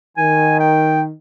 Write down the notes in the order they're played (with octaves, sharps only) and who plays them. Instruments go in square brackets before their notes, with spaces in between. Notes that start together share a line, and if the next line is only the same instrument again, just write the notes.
[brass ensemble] D#3 [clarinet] G#5
[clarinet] G5